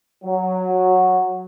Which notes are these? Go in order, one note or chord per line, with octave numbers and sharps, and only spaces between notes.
F#3